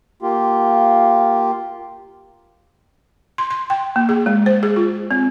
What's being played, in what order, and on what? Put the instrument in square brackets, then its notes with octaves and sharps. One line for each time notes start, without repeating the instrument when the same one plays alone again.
[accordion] A#3 F4 G4
[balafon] C6
C6
G5
A#3
G#4
G#3
C5
G#4
F4
C4